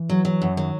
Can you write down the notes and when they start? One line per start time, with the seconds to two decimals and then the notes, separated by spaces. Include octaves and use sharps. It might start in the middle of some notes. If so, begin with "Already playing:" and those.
Already playing: E3
0.10 F#3
0.25 F#3
0.42 F#2
0.57 D#3 F#3